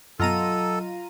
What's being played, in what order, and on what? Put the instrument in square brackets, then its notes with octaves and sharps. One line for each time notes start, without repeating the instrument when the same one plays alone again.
[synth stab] F#2 B2 [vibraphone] F#3 D#5 [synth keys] F4 A#5 D#7 [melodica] A4